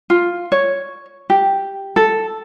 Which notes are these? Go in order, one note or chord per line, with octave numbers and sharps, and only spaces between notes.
F4
C#5
G4
A4